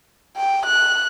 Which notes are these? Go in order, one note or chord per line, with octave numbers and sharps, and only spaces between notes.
G5
F#6